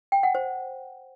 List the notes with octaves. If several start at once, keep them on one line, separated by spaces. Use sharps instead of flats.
G5
F#5
C5